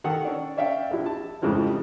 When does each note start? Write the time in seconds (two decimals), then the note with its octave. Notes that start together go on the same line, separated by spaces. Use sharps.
0.04 D#3 A4 F#5
0.25 C#4 D4
0.57 C#4 D4 E5 F5 G5
0.91 A#1 E4
1.06 A5
1.42 F2 G#2 C#3 E3 F3 G3